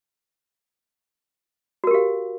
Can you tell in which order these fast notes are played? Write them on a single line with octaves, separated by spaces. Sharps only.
F#4 A#4 G4 F5